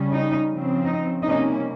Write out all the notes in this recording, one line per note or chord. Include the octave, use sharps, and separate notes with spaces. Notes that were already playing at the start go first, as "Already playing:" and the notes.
Already playing: C#3 G3 C#4
D#4
C#3 F3 C4
D#4
C3 G3 A#3 C#4 D#4